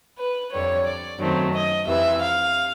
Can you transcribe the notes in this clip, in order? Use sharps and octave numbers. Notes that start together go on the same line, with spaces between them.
B4
F2 D3 G3 C#5
D5
F#2 D#3 F#3 A3 C4
D#5
F2 C3 E3 E5
F5